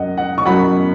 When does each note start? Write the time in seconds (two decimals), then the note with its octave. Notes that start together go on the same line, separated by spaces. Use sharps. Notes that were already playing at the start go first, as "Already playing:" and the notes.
Already playing: F#2 F#3 D#5 F#5
0.18 F#5
0.38 C#6
0.45 F#2 F#3 F#5 B5